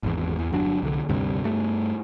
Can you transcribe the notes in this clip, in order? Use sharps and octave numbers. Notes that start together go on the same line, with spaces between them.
G#1 E2
E2
G1 F#3 D4
C2 D3
D2 G2 C3 G3
G2 A3